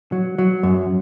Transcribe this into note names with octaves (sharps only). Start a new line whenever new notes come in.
F#3
F#3
F#2